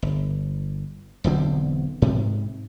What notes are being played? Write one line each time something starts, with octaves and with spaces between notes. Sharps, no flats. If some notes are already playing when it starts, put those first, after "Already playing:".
G1
E1 B1 D3 C4
G#2 C3